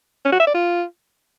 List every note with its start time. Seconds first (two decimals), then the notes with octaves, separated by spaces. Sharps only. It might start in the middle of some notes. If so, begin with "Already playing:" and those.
0.25 C#4
0.32 F#4
0.40 E5
0.47 D5
0.54 F4